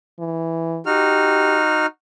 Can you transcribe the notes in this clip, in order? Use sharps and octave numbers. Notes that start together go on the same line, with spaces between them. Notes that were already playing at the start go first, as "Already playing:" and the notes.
E3
D#4 F#4 G4 F6